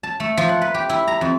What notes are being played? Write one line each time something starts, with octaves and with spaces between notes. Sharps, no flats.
A5
A3
F3
F#5
B4
G4
E4
A#5
F2